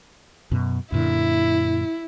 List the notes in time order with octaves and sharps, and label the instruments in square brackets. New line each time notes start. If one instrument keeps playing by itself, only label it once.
[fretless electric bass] F#2 B2
[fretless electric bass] F#2 A#2 D3 [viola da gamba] E4